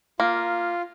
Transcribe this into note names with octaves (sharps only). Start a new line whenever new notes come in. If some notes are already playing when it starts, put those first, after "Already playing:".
A#3 F4